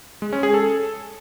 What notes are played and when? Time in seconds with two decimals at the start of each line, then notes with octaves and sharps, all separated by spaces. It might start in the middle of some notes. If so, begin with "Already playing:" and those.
0.22 G#3
0.33 C#4
0.43 G#4
0.54 A4